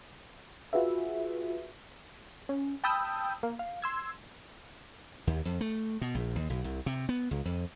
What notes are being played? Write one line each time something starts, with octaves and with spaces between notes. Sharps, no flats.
F4 F#4 G#4 B4 E5
C#4
G5 A5 B5 D#6 E6 G6
A#3
F5
C6 E6 G#6
D#2
F2
A3
B2
A#1
D#2
B1
C2
C3
B3
C#2
F2